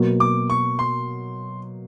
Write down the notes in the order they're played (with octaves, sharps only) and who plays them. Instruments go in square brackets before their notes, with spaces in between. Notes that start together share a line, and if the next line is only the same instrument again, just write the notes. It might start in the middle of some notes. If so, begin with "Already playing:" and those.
Already playing: [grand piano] B2 F#3 A#3
[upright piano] D6
C#6
C6